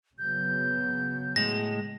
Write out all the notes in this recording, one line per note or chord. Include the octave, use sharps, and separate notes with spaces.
C#3 F#3 B3 G6
A2 G#3 A#6